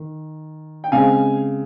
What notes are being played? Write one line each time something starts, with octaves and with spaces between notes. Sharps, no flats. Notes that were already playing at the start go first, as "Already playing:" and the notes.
Already playing: D#3
G5
C#3 G#3 C4 F5 G#5